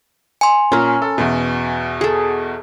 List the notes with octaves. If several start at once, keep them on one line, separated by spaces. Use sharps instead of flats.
G#5 C6
A#2 C#4 A#4
A4
E2 B2
G#4 A4